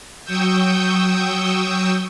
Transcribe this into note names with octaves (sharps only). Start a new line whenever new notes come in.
F#3 G5 C#6 D#6 E6 G6